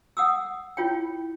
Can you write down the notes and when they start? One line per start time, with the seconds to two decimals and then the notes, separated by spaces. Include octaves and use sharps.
0.17 F#5 D#6 E6
0.77 E4 F4 C#5 G5